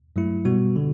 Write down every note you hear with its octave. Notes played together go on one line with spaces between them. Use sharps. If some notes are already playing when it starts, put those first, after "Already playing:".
G2 F#3 A3 E4
B2 G3 B3 F#4
D3